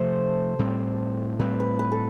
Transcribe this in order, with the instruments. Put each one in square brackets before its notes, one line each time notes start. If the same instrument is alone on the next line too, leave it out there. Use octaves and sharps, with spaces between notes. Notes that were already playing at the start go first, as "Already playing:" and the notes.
Already playing: [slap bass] C3 F3 A3 [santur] A4 C5
[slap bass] A2 G3 C4
[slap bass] A2 G3 C4 [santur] B4
[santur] B4
B4
A4